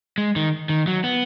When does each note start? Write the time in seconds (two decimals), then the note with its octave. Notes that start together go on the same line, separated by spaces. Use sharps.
0.18 G#3
0.36 D#3
0.69 D#3
0.87 F#3
1.04 B3